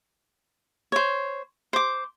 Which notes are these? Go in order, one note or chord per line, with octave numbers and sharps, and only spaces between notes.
C5 C#5
C5 D6